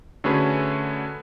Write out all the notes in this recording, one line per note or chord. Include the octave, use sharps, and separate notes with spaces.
D3 A3 C#4 F#4 G#4 B4